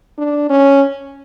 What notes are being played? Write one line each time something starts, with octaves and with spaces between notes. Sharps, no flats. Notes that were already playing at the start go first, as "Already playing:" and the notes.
D4
C#4